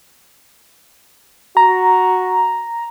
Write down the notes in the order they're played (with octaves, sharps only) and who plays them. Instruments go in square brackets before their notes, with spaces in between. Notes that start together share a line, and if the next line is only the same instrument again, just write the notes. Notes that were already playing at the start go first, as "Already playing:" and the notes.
[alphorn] F#4 [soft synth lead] A#5